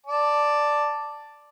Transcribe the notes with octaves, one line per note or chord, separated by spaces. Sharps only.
D5 A5